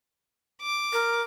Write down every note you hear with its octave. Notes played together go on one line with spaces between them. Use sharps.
D6
A#4